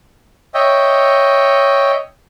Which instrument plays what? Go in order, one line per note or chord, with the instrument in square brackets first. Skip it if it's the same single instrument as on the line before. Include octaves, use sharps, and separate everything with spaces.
[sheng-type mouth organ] C#5 D#5 E5 G5